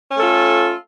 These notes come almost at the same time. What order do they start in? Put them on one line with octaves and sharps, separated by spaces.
C#4 A3 A4 F4